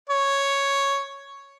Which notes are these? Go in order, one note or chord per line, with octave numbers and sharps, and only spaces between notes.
C#5